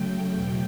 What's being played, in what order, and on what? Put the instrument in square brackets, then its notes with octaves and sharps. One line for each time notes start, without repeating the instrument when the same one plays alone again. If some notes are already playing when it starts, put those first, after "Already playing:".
Already playing: [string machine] C#3 F#3 A3 G5
E2 B2 F#3 G5